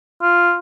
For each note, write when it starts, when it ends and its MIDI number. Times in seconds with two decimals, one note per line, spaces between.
0.22 0.57 65